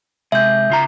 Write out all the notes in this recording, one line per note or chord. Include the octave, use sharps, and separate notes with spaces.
C3 G#3 E5 G6
C#3 F4 A#5